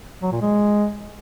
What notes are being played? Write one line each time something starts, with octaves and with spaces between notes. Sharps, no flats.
F#3
A#2
G#3